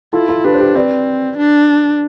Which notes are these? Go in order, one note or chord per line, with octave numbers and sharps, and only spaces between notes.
E4 F4 A4
F4 A4
D4 G4 B4
C5
G4 B4
C4 B4 D5
D4